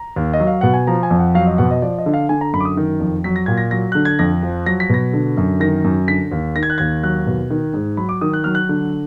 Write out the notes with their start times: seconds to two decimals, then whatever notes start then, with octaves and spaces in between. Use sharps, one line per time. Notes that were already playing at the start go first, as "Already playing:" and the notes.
Already playing: A#5
0.16 D#2
0.34 D#5
0.40 F#3
0.47 F5
0.61 B2 F#5
0.74 G#5
0.87 F3 A#5
1.03 G#5
1.11 F2
1.19 F#5
1.35 F#3 F5
1.47 D#5
1.58 B2 F#5
1.71 D#5
1.82 F3 D5
1.99 D#5
2.06 D3
2.14 F5
2.29 D3 G#5
2.41 A#5
2.53 F#2 B5
2.60 D6
2.65 D#6
2.77 D#3
3.00 F2
3.24 F#3 B6
3.36 A#6
3.46 A#2 G#6
3.57 A#6
3.71 F#3 A#6
3.92 D3 F#6
4.05 G#6
4.19 F2 A#6
4.43 F3
4.66 F#3 A#6
4.80 B6
4.90 B2 A#6
5.13 D3
5.37 F#2
5.60 D#3 A#6
5.84 F#2
6.08 D3 B6
6.32 D#2
6.56 D#3 A#6
6.63 G#6
6.70 F#6
6.78 D#2 G#6
7.03 F#3 F#6
7.27 B2
7.51 D#3
7.74 G#2
7.97 F#3 B5
8.09 D6
8.21 D#3 D#6
8.34 F#6
8.44 F#3 F6
8.55 F#6
8.69 D3